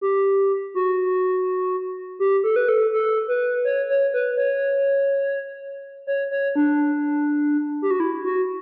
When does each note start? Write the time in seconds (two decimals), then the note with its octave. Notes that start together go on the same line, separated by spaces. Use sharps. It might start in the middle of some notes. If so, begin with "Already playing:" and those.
0.01 G4
0.75 F#4
2.19 G4
2.44 A4
2.56 B4
2.69 A4
2.93 A4
3.28 B4
3.65 C#5
3.89 C#5
4.14 B4
4.37 C#5
6.07 C#5
6.31 C#5
6.56 D4
7.82 G4
7.91 F#4
8.00 E4
8.25 F#4